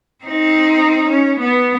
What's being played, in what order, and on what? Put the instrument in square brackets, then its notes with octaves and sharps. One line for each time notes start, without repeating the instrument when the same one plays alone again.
[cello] C4 D#4
C#4
B3